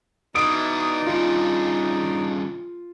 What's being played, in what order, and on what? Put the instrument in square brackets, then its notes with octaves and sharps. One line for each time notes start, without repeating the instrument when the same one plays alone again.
[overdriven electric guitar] B2 E3 [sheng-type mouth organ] D#4 D5 [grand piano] D#6 D7
[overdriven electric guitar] G2 C#3 [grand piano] F4